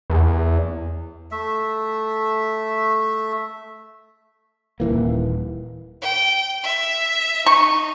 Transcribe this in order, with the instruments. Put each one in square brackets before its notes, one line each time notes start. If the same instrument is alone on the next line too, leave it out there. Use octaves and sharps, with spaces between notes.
[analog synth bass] E2
[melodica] A3 E5
[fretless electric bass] D#1 G#1 E3 A#3
[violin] G5
E5
[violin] D#4 [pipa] C#6